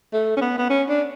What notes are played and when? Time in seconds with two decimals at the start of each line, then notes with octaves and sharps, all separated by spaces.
0.13 A3
0.37 C#4
0.41 B3
0.58 B3
0.70 C#4
0.88 D4